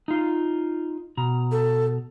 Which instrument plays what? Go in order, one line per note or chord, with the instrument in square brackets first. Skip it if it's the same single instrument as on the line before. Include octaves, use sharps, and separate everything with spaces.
[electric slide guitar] D#4 F4
B2 A#5
[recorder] A4